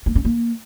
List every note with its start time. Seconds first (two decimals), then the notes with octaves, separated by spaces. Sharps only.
0.06 A#3
0.15 C#4
0.25 A#3